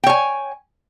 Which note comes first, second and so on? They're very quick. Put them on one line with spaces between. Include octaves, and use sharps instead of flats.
G5 C#5 G#5